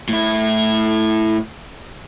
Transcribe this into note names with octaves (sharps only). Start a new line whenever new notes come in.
A2 E4